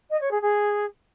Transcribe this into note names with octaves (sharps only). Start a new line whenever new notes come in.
D#5
C#5
G#4
G#4